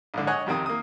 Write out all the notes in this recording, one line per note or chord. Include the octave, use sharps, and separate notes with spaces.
A#1 G#2 D3
C#5 D#5 F#5 G#5
F2 C3 D#3 C4 D#6
A#3 D#6